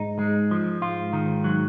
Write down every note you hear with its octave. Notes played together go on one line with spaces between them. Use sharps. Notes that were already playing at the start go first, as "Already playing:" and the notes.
Already playing: G#2 D#4
G#3
F3
G#2 F4
D#3
F#3